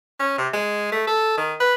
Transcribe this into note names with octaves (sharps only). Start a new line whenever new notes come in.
C#4
C3
G#3
A3
A4
D#3
B4